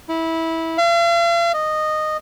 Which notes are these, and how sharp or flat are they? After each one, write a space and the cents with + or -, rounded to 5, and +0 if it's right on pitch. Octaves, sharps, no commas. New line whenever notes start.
E4 -15
F5 -45
D#5 -15